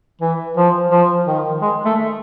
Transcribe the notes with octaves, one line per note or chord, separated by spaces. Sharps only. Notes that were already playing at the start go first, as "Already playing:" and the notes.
E3
F3
F3
D#3
G#3
A3